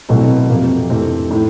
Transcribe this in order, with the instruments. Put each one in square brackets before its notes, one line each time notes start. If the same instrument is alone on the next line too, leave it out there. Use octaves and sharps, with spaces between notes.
[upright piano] C2 B2 F#3 A3 C4
F2 C3 F3 A#3
F2 C3 E3 A3 C4
A2 E3